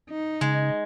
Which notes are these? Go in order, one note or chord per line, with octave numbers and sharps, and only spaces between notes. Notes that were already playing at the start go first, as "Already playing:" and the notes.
D#4
C#3 G#3